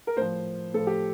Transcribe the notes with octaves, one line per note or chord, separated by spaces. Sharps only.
A#4
A2 F3 C5
A2 F3 A4
G4